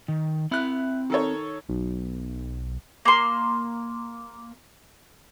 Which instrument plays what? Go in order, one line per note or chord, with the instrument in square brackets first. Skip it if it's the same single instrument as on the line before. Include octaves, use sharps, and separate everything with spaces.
[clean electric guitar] D#3
[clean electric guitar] C4 B5 [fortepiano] E4 F#6
[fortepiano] D#3 A4 C#5
[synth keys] B1
[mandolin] A#3 C6